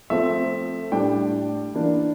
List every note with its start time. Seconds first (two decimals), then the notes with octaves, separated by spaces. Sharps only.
0.10 F3 A3 C4 E5
0.92 A2 G3 D4 G5
1.74 E3 A#3 D4